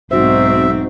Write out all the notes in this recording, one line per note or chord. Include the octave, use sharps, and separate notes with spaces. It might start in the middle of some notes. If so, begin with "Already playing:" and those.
B1 G#2 C4 D#4 F#4 C5 E5